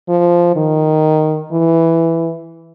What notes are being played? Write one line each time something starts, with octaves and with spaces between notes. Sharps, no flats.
F3
D#3
E3